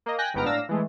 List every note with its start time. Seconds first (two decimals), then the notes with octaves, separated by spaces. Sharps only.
0.06 A#3 D#5
0.18 G5 G#5 F#6 A#6 B6
0.34 G1 G#2 B3 G5 A#5 F6
0.45 A2 D4 F5 E6 A#6
0.69 E3 G#3 A3